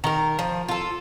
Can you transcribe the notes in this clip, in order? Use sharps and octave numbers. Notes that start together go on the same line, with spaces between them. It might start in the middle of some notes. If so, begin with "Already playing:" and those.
D#3 A#4
F3
F4 A4